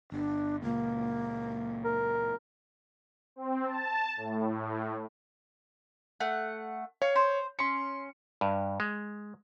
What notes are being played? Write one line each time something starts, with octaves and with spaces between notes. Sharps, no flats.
G1 D4
C#2 A#2 A#3
A#4
C4
A5
A2
A3 F#5
C#5 F5 C#6
C5
C#4 C6 C#7
G2
G#3